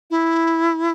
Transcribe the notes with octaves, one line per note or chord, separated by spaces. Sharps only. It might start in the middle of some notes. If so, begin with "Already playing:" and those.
E4